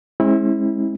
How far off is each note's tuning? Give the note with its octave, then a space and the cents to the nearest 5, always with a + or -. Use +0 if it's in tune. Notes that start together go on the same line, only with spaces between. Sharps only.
G#3 +0 C4 +45 E4 -20